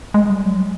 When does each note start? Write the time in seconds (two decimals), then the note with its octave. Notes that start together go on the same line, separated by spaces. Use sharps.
0.14 G#3
0.30 G3
0.45 F#3